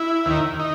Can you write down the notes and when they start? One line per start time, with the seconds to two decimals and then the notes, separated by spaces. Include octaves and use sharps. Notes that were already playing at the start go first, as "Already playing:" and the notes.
Already playing: E4
0.26 D#2 D#3
0.59 D#4